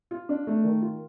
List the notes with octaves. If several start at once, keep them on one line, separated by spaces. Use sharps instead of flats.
F4
D4
A3
D#3
F4